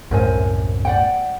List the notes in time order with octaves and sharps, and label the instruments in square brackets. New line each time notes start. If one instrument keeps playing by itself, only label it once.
[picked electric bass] C2 F#2 A2 [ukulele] A#4 C5 G#5
[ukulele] D5 F#5 G5